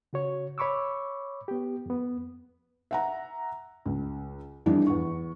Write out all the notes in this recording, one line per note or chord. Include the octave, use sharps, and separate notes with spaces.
C#3 F#4 C#5
C#5 B5 C#6 D6 E6
B3 G4
F2 B3
E5 F#5 A#5
C#2
F2 E3 G3 D4
E2 C#6